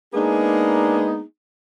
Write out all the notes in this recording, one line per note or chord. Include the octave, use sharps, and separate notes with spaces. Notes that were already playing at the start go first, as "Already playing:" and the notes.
G#3 A#3 B3 D4 D#4 G#4